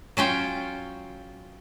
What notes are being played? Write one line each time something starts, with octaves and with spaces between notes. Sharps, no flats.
F#3 C#4 F4 G5